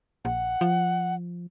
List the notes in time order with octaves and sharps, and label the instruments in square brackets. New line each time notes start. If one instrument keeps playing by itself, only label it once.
[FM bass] A#1 [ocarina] F#5
[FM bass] F3